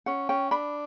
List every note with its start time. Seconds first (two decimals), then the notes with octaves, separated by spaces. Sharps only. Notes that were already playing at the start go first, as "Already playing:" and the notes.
0.06 C#4 F#5
0.29 C#4 G5
0.51 D4 B5